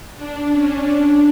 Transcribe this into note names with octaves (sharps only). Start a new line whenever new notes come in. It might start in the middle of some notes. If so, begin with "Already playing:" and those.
D4
C#4
D4